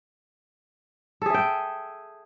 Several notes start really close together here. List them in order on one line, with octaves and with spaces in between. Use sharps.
A4 G#4 E5 G5